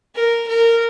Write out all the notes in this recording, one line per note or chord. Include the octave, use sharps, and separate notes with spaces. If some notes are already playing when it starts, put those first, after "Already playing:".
A#4
A#4